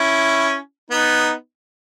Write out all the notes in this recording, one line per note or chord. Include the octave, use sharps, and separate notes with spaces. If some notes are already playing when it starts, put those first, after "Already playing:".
Already playing: C#4 E4
B3 D#4